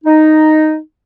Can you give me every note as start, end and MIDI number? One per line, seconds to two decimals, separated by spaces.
0.04 0.76 63